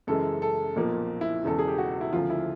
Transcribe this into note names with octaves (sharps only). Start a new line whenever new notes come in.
F#2 C#3 E3 G#3 A4
A4
B1 A#2 F3 A#3
E4
E1 E2 C#3 A4
G#4
G4
F#4
E4
D2 C#3 F3 F4
E4